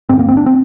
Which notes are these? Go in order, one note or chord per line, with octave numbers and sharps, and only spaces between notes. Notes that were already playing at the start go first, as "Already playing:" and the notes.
G2 D3 C4
A#3
C4
D4
C4